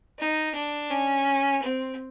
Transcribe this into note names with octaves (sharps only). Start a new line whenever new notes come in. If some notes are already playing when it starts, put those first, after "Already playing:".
D#4
D4
C#4
C4